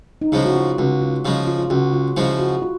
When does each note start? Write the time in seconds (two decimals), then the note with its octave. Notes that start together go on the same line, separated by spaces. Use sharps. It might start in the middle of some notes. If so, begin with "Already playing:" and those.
0.22 D#4
0.32 C#3 F3 G#3 E4
0.46 F#4
0.56 F4
0.78 C#2 F#4
1.01 F4
1.25 C#3 F3 G#3
1.47 F4
1.59 F4
1.70 C#2 F#4
1.93 F4
2.17 C#3 F3 G#3 E4
2.39 F#4
2.62 F4